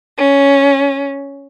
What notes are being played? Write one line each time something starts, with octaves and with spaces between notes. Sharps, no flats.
C#4